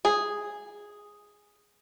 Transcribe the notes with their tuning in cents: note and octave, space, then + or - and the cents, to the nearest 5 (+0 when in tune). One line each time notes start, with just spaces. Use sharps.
G#4 -5